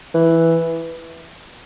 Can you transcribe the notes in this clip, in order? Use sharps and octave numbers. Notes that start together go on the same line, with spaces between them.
E3